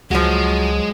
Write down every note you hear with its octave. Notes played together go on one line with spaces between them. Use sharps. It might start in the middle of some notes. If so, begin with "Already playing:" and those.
C#2 F3 F#3 G#3 F#4